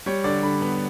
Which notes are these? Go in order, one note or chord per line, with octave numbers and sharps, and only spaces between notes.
G3 C#5
D3 D5
D3 B5
B3 B5